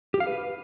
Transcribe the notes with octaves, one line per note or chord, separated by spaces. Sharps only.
G4
F5
B4